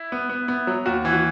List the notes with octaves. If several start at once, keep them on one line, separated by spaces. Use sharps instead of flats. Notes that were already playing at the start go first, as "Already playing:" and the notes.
Already playing: E4
B3
B3
B3
F#3
D#2 F#4
E3
F#4